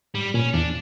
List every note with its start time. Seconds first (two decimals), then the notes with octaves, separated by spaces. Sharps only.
0.14 G#2 G3
0.34 A#2 C#4
0.53 E2 D4